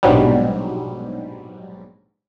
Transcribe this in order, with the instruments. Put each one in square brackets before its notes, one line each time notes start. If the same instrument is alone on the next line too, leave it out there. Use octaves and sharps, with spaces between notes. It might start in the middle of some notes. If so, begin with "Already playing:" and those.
[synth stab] A#1 G#2 B2 F#3 G3